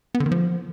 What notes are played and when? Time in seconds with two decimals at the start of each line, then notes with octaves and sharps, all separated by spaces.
0.15 B3
0.20 D3
0.26 D#3
0.32 F3